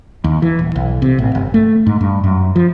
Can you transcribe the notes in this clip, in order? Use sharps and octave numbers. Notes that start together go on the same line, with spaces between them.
D#2
E3
D#1
B1
C3
A1
G1
A3
G#2
G2
F#2
F3